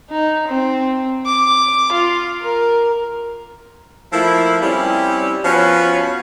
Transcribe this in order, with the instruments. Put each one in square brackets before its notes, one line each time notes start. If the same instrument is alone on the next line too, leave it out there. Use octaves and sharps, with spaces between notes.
[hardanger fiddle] D#4
C4
D6
F4
A#4
[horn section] F3 A3 A#3 E4
G3 C4 C#4 E4
F3 B3 C#4 F#4 B4 C#5